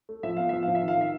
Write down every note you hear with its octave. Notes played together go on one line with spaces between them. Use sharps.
A3
F3 E5
B3 F5
F3 E5
F5
F3
E5
D#3
F5
D#3 E5